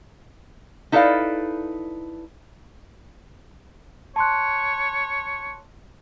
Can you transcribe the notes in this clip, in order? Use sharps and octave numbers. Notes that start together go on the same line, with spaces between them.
D#4 E4 A4 B4 D5 F5
C#5 A5 C6 F#6